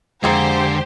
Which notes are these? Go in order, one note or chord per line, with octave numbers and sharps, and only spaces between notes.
F2 D3 G#3 A#3 C4 G4 G#4 C5